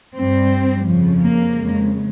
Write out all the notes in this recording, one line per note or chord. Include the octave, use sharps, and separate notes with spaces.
G2 G3 C4
F2 C#3 F3
A#3
F2 C#3 G#3